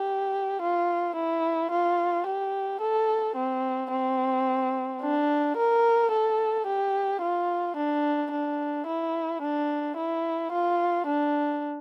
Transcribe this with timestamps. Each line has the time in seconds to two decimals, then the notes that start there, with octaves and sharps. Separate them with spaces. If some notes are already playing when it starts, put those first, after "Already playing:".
Already playing: G4
0.62 F4
1.16 E4
1.72 F4
2.27 G4
2.81 A4
3.36 C4
3.91 C4
5.02 D4
5.57 A#4
6.12 A4
6.67 G4
7.22 F4
7.77 D4
8.32 D4
8.87 E4
9.42 D4
9.97 E4
10.52 F4
11.07 D4